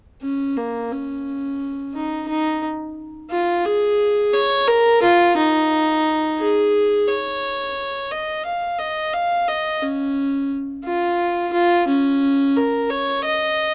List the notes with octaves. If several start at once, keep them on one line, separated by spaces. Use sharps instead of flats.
C#4
A#3
C#4
D#4
D#4
F4
G#4
C#5
A#4
F4
D#4
G#4
C#5
D#5
F5
D#5
F5
D#5
C#4
F4
F4
C#4
A#4
C#5
D#5